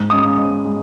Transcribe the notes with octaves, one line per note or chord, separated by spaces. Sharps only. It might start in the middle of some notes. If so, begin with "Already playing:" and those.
Already playing: G#2
G#3 C#4 D#6
G#2
G#3